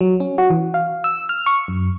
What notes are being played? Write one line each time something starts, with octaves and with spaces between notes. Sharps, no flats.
F#3
C#4
F#4
E3
F5
E6
F6
C#6
F#2